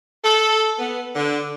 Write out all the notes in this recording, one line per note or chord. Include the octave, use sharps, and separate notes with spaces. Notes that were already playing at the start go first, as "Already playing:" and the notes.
A4
B3
D3